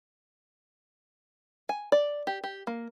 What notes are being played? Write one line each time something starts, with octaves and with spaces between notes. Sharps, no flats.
G#5
D5
G4
G4
A#3